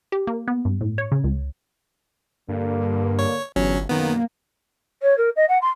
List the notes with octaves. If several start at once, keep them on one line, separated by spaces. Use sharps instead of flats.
G4
A#3
B3
G2
A2
C#5
C#3
C#2
G2 D3 A#3
C#5
G1 E2 F#3 C#4
B1 F#2 D#3 A#3 B3
C#5
A#4
D#5
F#5
C6